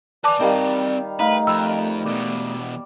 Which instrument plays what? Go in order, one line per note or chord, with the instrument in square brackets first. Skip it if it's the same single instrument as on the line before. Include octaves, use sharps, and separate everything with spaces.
[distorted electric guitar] B4 G#5 [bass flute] D5 [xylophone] A5 D6
[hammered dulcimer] D#3 G3 F5 [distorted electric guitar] C4 D#5
[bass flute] A3 [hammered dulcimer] D#4 F5 [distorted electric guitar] B4
[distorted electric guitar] F2 [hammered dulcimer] B5 [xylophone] E6
[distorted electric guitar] E2 B2 [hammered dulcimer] D5